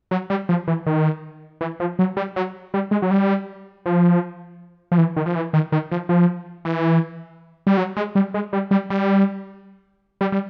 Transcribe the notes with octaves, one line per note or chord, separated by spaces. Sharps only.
F#3
G3
F3
E3
D#3
E3
F3
F#3
G3
F#3
G3
G#3
F#3
G3
F3
F3
E3
D#3
F3
E3
D#3
D#3
F3
F3
E3
G3
F#3
G#3
G3
G#3
G3
G3
G3
G3
G3